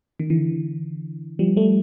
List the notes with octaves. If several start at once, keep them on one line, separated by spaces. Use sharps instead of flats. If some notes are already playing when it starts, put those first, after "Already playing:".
D#3
D3 E3
F3 G3
G3 A3